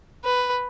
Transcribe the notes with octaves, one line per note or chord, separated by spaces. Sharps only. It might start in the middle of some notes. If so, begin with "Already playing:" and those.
B4